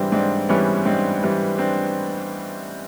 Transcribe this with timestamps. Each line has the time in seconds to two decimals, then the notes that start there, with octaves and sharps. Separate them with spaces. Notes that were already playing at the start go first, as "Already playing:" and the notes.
Already playing: G#2 E3 G3 C4 D4
0.12 G#2 C4 D4
0.49 E3 G3 B3 C#4
0.85 G#2 C4 D4
1.23 E3 G3
1.58 C4 D4